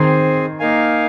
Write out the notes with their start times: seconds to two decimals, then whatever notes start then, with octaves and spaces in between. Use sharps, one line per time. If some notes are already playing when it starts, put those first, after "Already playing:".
Already playing: D#3 C4 G#4 C5 G#5
0.59 A#3 D#4 A#4 F5 G#5